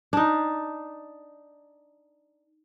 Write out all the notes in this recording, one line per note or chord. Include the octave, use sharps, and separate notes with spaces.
D4 D#4